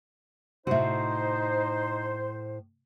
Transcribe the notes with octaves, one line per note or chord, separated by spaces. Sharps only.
A2 C3 D#4 F#4 C5 E5